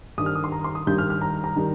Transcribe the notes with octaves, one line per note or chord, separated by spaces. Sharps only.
G2 D#3 G3 D#6
F6
D#6
C6
A#5
C6
D#6
G2 D#3 G3 G6
F6
F6
A#5
A#5
D#3 G3